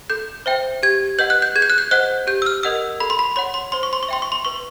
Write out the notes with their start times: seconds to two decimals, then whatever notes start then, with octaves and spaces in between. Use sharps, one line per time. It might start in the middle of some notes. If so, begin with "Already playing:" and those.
0.10 A4 G6
0.46 C5 E5 G5
0.83 G4 G#6
1.19 B4 D#5 F#5 G6
1.30 F#6
1.42 G6
1.56 G#4 G#6
1.62 G6
1.70 F#6
1.78 G6
1.91 C5 D#5 F#5 F#6
2.27 G4 G6
2.42 E6
2.46 F6
2.63 A#4 D#5 F#5 E6
3.00 A4 B5
3.10 C6
3.19 B5
3.36 C#5 F#5 C6
3.54 C6
3.72 C5 C6
3.83 C#6
3.93 C6
4.03 C#6
4.09 E5 G5 C6
4.22 C#6
4.32 C6
4.45 B4 C#6